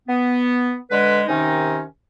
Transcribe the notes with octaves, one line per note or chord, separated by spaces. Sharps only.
B3
D3 G#3 B4
D#2 C3 D#3 C#4 D#4